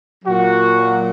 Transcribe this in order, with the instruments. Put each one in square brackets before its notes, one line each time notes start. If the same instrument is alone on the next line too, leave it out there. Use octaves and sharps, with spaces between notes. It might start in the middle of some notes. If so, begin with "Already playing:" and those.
[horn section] A#2 F#3 F#4